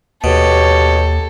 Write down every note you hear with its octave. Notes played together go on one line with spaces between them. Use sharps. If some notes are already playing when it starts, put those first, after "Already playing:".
D#2 B2 G4 A4 C#5